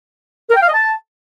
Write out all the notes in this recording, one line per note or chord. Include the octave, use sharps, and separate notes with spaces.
A#4
G5
F5
D#5
A5